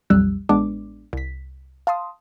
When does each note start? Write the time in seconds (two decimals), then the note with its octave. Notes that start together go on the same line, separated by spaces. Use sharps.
0.10 B1 F2 G3 E6 F#6
0.49 A1 G#3 B3 D4 D6
1.13 C2 B6
1.87 F5 A5 C6 D#6